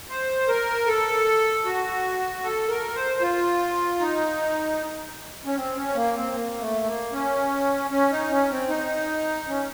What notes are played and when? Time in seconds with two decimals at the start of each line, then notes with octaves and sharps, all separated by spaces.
0.09 C5
0.48 A#4
0.87 A4
1.65 F#4
2.43 A4
2.69 A#4
2.95 C5
3.21 F4
4.00 D#4
5.46 C#4
5.56 C4
5.76 C#4
5.95 A#3
6.16 C4
6.35 A#3
6.60 A3
6.86 A#3
7.13 C#4
7.91 C#4
8.11 D#4
8.30 C#4
8.50 C4
8.69 D#4
9.48 C#4